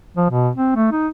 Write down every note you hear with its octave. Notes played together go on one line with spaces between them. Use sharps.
F3
B2
C4
A3
D#4